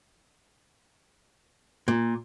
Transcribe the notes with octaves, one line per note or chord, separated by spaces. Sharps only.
A#2